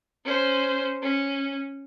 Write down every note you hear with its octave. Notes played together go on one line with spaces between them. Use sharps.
C#4 C5
C#4